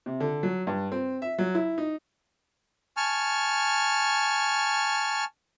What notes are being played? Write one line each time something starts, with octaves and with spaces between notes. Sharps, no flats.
C3
D3
F#3
G2
C4
E5
F#3
E4
D#4
G#5 A5 C#6 F6